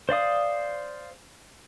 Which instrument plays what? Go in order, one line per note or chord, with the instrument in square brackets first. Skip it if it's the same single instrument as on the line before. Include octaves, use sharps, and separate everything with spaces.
[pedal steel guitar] C5 D5 F5 D#6